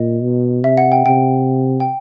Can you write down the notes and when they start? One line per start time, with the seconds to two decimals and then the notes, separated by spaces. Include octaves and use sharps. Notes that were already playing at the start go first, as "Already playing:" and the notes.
Already playing: A#2 D#5
0.23 B2
0.64 C3 E5
0.77 F#5
0.92 G5
1.06 C3 G5
1.80 G5